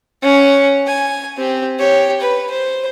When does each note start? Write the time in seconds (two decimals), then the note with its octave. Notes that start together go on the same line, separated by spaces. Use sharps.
0.23 C#4 F#5
0.86 G#5
1.37 C4 G4
1.79 G4 C#5
2.20 B4
2.50 C5